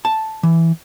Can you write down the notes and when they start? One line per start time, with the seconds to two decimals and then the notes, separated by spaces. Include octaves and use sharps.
0.05 A5
0.43 E3